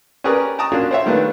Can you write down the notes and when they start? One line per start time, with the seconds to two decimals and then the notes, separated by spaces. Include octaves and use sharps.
0.24 C#4 G4 G#4 A#4 B4 D5
0.58 G5 A5 A#5 C#6 D#6
0.72 A#3 C#4 D4 F4 F#4
0.91 C5 C#5 E5
1.06 D#3 G3 A3 B3 D4 F4